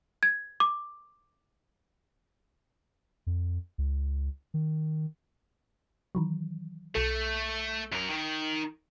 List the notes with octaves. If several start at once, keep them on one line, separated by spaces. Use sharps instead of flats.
G#6
D6
F2
C#2
D#3
D#3 E3 F#3
B1 A3 A4
F#2 A#4
D#3